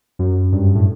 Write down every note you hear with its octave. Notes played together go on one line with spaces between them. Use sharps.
F#2
G2
A2